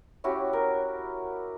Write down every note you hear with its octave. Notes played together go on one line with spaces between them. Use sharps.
C#4 E4 F#4 G4
A#4